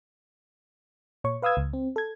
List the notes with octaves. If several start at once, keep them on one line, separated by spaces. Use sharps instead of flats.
A#2 C#5 C#6
B4 F5 D#6 E6 G#6
C#2
C4
A4 G#6